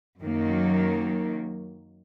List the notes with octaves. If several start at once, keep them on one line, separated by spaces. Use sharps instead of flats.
F#2 D#3 F#3 A#3